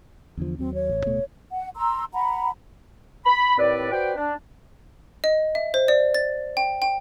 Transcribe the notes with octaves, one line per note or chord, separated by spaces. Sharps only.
E2 D3 F3
D#2 F#3 C4
C#5
A1
D1 B2 A3
F#5
A#5 C6 E6
F#5 A#5 B5
B5
D#2 A2 C4 B4 D5
F#4 B4 C5 D5 G5
D4
D#5
E5
C5
D5
A6
G5
G5